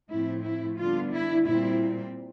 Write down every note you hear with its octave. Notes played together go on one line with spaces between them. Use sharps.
A2 F3 A3 C4 E4
E4
D3 G3 B3 D4 F4
E4
A#2 G3 C4 E4